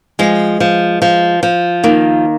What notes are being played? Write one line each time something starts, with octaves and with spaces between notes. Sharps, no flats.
F3 G#3
F3
F3
F3
D#3 A#3